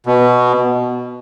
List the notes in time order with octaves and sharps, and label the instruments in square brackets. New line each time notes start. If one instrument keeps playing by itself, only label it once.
[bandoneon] B2